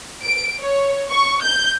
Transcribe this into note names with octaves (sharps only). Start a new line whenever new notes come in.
D7
C#5
C#6
G6